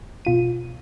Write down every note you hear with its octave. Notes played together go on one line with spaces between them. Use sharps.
B2 F4 D#7